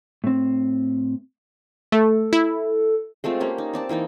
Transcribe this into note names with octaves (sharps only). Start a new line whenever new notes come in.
A2 C4
A3 A4
E4
G#3 A3 C4 F4
A#3 C#4 G4
D#4
C4 D5 A5
E3 A#3 D#4 G5